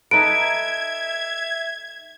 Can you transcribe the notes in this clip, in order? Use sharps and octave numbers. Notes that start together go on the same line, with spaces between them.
D#4 A4 B4 E5 G#6 D7